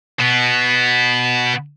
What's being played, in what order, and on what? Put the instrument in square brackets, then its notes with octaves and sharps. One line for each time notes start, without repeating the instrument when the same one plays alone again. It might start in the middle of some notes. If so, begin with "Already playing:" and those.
[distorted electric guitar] B2 B3